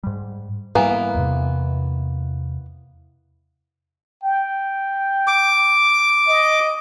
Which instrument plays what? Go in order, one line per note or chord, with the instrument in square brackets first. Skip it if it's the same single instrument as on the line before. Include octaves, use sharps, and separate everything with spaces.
[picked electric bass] G#2 G3
[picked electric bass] G#2 G3 [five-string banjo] E3 A#3 B3
[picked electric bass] E2 C3
[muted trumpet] G5
[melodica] D6
[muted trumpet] D#5